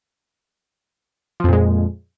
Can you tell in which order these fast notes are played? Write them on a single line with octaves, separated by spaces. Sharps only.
F3 F2 A#2 G#3